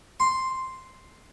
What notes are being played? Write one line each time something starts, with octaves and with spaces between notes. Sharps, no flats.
C6